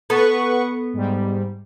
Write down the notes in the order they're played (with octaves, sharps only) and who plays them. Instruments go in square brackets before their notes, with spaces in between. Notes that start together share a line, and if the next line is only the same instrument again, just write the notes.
[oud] B3 A4 [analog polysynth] B4 F#5 C#6
[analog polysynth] G#2 G3